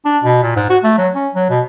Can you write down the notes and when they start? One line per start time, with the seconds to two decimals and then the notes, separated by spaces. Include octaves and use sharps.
0.05 D4
0.24 B2
0.43 A#2
0.56 G#2
0.70 F#4
0.84 A3
0.98 F#3
1.15 C#4
1.35 F#3
1.50 B2